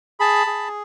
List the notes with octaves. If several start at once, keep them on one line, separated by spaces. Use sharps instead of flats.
G#4 A5 B5
G#4